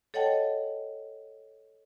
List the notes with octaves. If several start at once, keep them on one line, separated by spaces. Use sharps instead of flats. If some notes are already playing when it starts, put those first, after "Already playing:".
A4 C#5 D#5 F#5 G5 A5